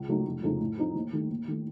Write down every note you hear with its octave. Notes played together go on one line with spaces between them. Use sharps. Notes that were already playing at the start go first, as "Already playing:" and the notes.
Already playing: C#2
C#3 F#3 A3 D#4
F1
F2 C#3 A3 D#4
A2
F3 C4 D#4
D#2
D#3 A3
D#2
D#3 A3